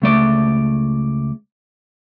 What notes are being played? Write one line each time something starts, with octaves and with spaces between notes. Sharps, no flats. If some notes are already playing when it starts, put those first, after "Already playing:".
C#2 A3 D5